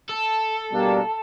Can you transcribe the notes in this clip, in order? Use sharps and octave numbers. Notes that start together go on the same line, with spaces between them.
A4
B2 G3 A#3 D4